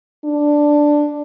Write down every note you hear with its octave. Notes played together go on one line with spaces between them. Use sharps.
D4